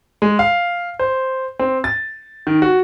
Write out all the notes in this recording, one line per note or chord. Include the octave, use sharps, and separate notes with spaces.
G#3
F5
C5
C4
A6
D#3
F#4